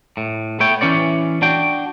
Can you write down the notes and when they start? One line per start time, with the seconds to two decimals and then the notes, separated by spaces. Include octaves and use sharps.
0.17 A2
0.60 A3 B3 C#5 G5
0.81 E3 C#4 C#5 D5
1.42 D4 F#4 G5